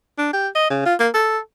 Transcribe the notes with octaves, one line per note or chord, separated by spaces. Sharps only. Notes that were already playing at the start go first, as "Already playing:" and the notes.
D4
G4
D#5
C#3
F4
A#3
A4